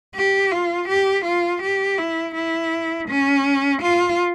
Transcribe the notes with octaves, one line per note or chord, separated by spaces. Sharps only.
G4
F4
G4
F4
G4
E4
E4
C#4
F4